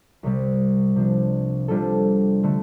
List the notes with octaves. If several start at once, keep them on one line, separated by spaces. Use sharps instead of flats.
C2 C3 G3
C3 F3 D4
C3 G3 D4 F4 A4
D3 A3